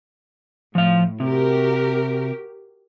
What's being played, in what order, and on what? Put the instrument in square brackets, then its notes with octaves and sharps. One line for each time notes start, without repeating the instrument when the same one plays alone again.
[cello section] A2 [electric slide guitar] F3 F5
[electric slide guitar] C3 [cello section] F#4 G4 A#4